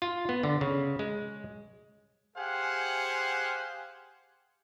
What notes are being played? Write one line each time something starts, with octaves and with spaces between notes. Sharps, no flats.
F4
B3
D3
C#3
G#3
G4 G#4 C5 F5 F#5 G#5